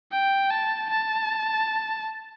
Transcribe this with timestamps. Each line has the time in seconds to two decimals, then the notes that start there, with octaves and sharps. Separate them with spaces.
0.12 G5
0.50 A5
0.90 A5